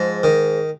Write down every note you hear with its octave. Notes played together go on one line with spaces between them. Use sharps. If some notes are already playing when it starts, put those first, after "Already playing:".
Already playing: G#2 F3
D#3